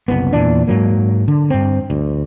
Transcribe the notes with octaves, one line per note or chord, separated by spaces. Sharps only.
F#1 C2 B3
E2 A#2 E3 D4
G#2 F#3 A#3
D3
G2 C4
D2